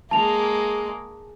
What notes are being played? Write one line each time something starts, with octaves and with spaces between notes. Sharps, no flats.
G#3 A#3 A5 F7